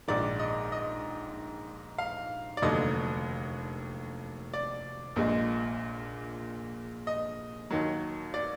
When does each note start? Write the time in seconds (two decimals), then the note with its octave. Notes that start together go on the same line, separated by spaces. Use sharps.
0.08 A#1 G#2 D#3 D5
0.39 D#5
0.72 D#5
1.98 F5
2.57 D5
2.62 F1 D#2 D3 F#3 D#5
4.53 D5
5.16 A#1 A#2 G#3
7.07 D#5
7.71 D#2 D#3 F#3
8.34 D5